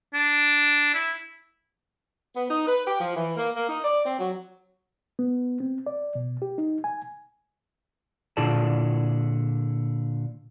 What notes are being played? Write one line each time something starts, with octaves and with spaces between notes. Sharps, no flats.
D4
E4
B3
D#4
B4
G4
F3
E3
A#3
A#3
D#4
D5
C4
F#3
B3
C4
D5
B2
G4
D#4
G#5
A#2 D3 E4 G#4 D5 A5